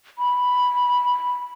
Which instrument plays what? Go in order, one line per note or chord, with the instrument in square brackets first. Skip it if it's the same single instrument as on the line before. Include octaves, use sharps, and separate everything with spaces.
[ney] B5